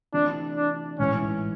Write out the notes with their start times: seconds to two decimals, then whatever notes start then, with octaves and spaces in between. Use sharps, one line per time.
0.13 C3 E3 A3 C4 D4 F4
0.56 D4
0.99 A1 G#2 E3 C#4